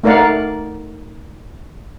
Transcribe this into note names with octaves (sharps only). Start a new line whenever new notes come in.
A3 D#4 A#4 D5 F5 F#5